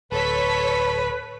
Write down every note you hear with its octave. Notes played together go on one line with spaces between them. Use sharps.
D1 A4 B4 C#5 B6